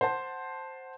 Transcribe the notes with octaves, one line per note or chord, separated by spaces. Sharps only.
C5 F#5 A5